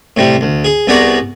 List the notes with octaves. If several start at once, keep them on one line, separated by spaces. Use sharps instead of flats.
A2 C3 G3
D2
G#4
C2 B3 G#4 D5 A#5 C#6